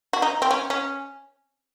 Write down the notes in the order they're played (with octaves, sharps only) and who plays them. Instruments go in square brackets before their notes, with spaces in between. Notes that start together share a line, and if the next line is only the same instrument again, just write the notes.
[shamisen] F#4
D#4
C4
C#4
C#4